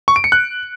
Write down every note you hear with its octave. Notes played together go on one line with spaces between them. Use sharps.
C#6
D7
C#7
F#6